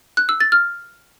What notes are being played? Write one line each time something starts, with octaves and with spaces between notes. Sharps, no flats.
F#6
E6
A6
F6